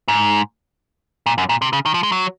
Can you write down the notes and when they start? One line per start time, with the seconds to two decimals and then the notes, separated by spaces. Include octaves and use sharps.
0.08 G#2
1.26 A#2
1.38 F#2
1.49 A#2
1.62 C3
1.73 C#3
1.86 D#3
1.94 F3
2.03 G#3
2.12 F#3